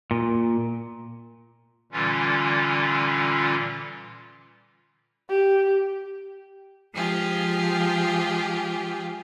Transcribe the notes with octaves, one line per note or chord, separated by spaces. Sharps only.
A#2
A#2 D3 E3 G3 C#4 F4
G4
F3 G#3 F4 G4 G#4